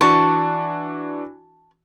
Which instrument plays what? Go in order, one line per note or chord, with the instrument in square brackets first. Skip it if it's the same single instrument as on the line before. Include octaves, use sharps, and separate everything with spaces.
[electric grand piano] E3 D4 F#4 [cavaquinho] A5 C#6